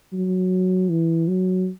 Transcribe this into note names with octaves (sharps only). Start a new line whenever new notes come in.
F#3
E3
F#3